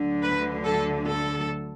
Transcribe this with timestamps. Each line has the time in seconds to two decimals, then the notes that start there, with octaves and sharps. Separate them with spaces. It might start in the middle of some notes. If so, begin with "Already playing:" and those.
Already playing: D2 D3 F#3
0.23 B4
0.65 A4
1.06 A4